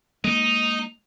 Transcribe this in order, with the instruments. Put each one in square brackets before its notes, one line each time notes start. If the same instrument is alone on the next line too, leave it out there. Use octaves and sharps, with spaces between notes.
[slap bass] G#3 A#3 [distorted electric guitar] D#4